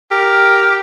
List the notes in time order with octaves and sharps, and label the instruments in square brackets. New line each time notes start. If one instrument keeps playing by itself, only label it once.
[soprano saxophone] G4 [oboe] A#4